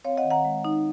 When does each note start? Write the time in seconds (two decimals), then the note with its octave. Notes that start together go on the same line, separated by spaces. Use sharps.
0.05 C4 C#5 F5
0.17 D#5 F#5
0.24 D#3
0.30 F#5 A#5
0.45 G#3
0.65 D#4